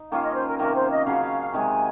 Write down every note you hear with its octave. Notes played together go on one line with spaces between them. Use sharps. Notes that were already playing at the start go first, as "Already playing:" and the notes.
Already playing: D#4
D#3 A#3 C#4 F4 F5
D#5
C5
A#4
C3 D#3 A#3 C#4 A#4
C5
D#5
C#3 F#3 C#4 F5
C3 D#3 G#3 G#5